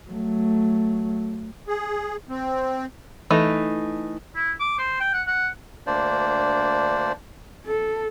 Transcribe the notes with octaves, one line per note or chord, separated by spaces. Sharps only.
F#3 A3
G#4
C4
E3 A3 D#4
E4
D6
C5
G5
F#5
F#5
D2 A#3 D4 C5 D5
A4